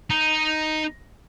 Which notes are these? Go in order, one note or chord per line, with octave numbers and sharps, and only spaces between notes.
D#4